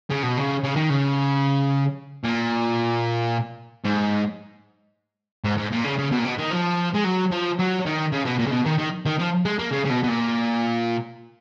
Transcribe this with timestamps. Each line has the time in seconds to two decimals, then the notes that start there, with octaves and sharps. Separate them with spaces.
0.10 C#3
0.23 B2
0.38 C#3
0.63 C#3
0.76 D#3
0.90 C#3
2.24 A#2
3.84 G#2
5.44 G#2
5.57 G#2
5.72 A#2
5.84 C#3
5.98 C#3
6.12 B2
6.19 A#2
6.25 B2
6.38 D#3
6.51 F3
6.95 G#3
7.05 F#3
7.32 F3
7.59 F#3
7.85 D#3
8.12 C#3
8.26 B2
8.39 A#2
8.47 C#3
8.52 B2
8.66 D#3
8.79 D#3
9.06 D#3
9.19 F3
9.45 G#3
9.59 A#3
9.72 C#3
9.85 C#3
9.90 B2
10.04 B2
10.08 A#2